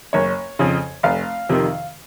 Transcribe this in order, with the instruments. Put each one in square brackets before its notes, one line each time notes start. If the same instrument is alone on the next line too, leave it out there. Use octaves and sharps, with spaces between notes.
[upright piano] F#1 C#5
F2 C#3
F1 F5
F2 C3 D#3